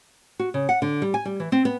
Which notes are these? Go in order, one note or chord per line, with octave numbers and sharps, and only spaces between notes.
F#4
C#3
F#5
D3
G3
G#5
G3
E3
C4
B3